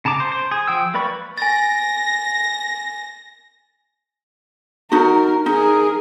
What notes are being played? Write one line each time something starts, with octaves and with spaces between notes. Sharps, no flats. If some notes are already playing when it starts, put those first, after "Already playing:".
C#3 A5 A#5 D6
C5
C5
G#4
F3 G5 E6
A#3 B4 D5 B5 C#6
G#5 A6 A#6
D#4 F#4 A#4
D#4 G#4 A#4